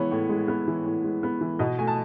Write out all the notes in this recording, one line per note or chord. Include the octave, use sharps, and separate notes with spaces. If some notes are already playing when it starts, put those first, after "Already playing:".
Already playing: E3 G#3 B3 C#5
A2
G#3
B3
E3
A2
G#3
B3
E3
B2 D#5
A3 G#5
A5